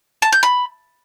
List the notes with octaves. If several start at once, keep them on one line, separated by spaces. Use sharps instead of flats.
A5
G6
B5